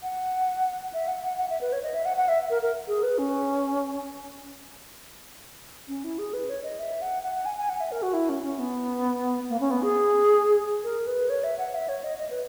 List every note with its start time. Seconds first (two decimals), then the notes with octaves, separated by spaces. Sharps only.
0.03 F#5
0.93 E5
1.08 F#5
1.24 F#5
1.38 F#5
1.50 E5
1.61 B4
1.73 C#5
1.83 D#5
1.94 E5
2.05 F#5
2.17 F#5
2.28 E5
2.50 A#4
2.62 A#4
2.88 G#4
3.03 B4
3.18 C#4
5.88 C#4
6.04 E4
6.19 G#4
6.34 B4
6.49 C#5
6.63 D#5
6.79 E5
7.02 F#5
7.23 F#5
7.35 F#5
7.46 G#5
7.58 G#5
7.69 F#5
7.81 E5
7.92 A#4
8.02 F#4
8.13 E4
8.29 C#4
8.43 C#4
8.59 B3
9.49 A#3
9.60 C#4
9.71 B3
9.83 G#4
10.84 A#4
11.07 B4
11.30 C#5
11.44 E5
11.58 F#5
11.75 E5
11.89 C#5
12.04 D#5
12.18 D#5
12.30 B4